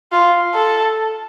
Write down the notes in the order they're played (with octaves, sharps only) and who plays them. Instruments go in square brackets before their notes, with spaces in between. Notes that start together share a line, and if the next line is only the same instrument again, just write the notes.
[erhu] F4
A4